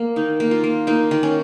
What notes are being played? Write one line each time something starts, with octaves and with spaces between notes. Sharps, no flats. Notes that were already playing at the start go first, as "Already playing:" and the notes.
Already playing: A#3 A#4
D#3 D#4
A#3
F4
A#3
A#3 D#4
D#3
C#4